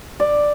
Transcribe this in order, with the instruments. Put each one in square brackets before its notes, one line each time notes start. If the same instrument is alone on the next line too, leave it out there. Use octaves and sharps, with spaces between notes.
[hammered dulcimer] D5